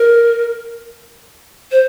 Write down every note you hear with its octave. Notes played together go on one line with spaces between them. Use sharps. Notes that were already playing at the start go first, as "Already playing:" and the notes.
Already playing: A#4
C5